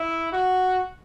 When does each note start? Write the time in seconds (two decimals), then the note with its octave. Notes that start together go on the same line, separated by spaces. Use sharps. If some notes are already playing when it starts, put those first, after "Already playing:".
Already playing: E4
0.33 F#4